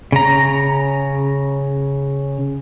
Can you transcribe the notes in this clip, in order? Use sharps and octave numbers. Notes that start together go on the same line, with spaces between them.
C#3 A#5